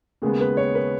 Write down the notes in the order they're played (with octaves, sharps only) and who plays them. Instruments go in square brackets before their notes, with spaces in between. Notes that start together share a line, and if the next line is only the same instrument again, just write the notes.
[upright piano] D#2 C#3 G#3 B3 G#4
B4
C#5
B4